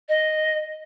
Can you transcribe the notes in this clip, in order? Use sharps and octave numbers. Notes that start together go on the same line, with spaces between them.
D#5